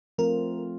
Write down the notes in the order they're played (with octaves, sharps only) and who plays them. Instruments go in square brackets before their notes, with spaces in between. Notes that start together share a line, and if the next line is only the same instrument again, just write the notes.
[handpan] F3 A3 C4 F4 [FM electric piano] A#4